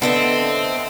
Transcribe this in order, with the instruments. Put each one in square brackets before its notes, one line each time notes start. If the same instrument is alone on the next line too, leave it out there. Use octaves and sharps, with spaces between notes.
[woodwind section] D3 [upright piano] B3 [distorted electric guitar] C4 [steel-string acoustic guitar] A4 D#5 E5